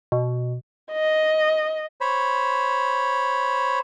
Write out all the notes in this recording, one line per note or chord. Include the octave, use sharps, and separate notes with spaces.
B2
D#5
C5 C#5 B5